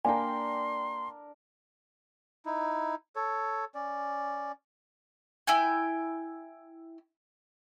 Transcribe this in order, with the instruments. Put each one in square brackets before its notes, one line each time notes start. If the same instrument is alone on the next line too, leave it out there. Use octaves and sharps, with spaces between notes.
[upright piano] A#3 F5 G5 [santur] D4 A#4 [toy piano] G#5 [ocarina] C6
[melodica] D#4 E4
A4 C#5
C#4 D5
[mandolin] E4 G5 G#5